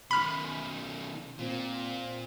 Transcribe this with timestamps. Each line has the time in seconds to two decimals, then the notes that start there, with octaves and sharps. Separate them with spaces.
0.11 B2 D#3 B5 F6
1.39 A#2 C4